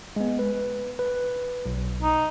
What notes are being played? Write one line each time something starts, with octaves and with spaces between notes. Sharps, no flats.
G#3 B3
B4
B4
B1
D#4